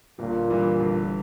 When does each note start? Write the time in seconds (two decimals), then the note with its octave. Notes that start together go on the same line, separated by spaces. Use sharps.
0.19 G1 A#2
0.50 G2 E3
0.80 G1